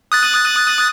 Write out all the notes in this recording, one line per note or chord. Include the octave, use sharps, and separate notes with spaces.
D#6 F#6 A6